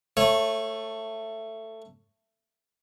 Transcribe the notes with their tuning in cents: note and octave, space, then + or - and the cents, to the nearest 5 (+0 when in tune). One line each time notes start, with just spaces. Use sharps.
A3 +15 C#5 -20